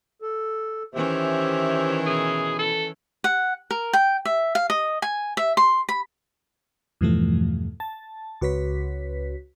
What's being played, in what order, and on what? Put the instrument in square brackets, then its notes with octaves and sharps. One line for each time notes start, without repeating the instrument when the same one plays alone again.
[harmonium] A4
[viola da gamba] D#3 E3 C#4 [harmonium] G4 C5 E5
[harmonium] B2 E4 [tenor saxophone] G#4
[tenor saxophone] A4
[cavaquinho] F#5
A#4
G5
E5
F5
D#5
G#5
E5
C6
B5
[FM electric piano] E2 G2 B2 E3 F3 A3
A5
C#2 F#4 B4 C#5 B6